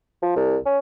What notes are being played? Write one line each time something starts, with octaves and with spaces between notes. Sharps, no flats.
F3
C2
C#4